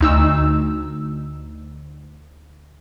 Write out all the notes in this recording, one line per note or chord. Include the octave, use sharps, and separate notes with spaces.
D2 D#4 E6